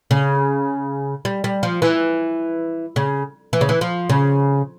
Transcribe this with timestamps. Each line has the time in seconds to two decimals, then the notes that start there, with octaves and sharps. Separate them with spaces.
0.11 C#3
1.25 G3
1.44 G3
1.63 F3
1.82 E3
2.96 C#3
3.53 E3
3.61 C#3
3.69 E3
3.81 F3
4.10 C#3